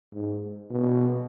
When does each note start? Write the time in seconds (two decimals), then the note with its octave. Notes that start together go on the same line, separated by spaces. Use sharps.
0.13 G#2
0.70 B2